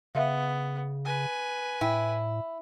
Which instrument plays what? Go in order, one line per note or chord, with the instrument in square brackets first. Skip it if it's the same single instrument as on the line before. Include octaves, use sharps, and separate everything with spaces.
[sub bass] C#3 [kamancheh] B3 [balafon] E5 F5
[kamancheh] B4 G#5
[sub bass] A2 [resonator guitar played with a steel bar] E4 [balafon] G5